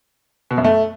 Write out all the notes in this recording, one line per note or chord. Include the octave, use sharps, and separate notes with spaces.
B2
F#2
A3